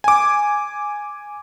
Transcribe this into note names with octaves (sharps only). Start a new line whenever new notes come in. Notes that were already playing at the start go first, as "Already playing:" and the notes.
G#5 D6